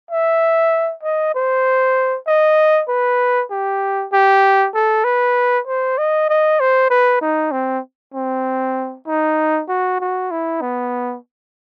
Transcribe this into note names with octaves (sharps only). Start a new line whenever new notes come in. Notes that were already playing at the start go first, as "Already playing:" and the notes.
E5
D#5
C5
D#5
B4
G4
G4
A4
B4
C5
D#5
D#5
C5
B4
D#4
C4
C4
D#4
F#4
F#4
E4
B3